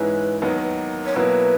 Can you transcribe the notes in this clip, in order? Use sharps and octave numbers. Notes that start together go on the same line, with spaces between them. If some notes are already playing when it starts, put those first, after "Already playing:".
Already playing: G#2 E3 G#3 C#4 E4 B4
D#2 D#3 F#3 B3 D#4
C#5
B2 F#3 A#3 E4 B4